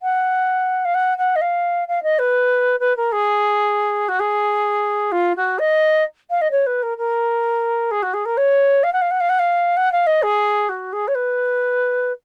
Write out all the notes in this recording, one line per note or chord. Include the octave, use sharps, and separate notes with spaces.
F#5
F5
F#5
F#5
D#5
F5
F5
D#5
B4
B4
A#4
G#4
F#4
G#4
F4
F#4
D#5
F5
D#5
C#5
B4
A#4
A#4
G#4
F#4
G#4
A#4
C#5
F5
F#5
F5
F#5
F5
F#5
F5
F#5
F5
D#5
G#4
F#4
G#4
C#5
B4